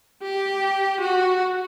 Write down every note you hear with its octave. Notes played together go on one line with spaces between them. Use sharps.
G4
F#4